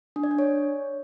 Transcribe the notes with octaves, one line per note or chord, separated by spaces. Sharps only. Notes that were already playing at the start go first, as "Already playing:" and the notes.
D4
D5
D4
C#5